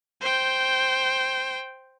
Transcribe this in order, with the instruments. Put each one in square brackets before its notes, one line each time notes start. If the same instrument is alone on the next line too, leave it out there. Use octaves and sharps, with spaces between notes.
[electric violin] C5 G5